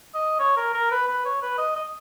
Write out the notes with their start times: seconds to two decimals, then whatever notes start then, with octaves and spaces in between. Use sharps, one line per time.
0.15 D#5
0.39 C#5
0.57 A#4
0.74 A#4
0.91 B4
1.08 B4
1.25 C#5
1.42 B4
1.58 D#5
1.76 D#5